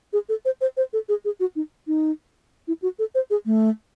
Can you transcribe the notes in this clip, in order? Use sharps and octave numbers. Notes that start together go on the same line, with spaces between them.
G#4
A4
C5
C5
C5
A4
G#4
G#4
F#4
D#4
D#4
E4
F#4
A4
C5
G#4
A3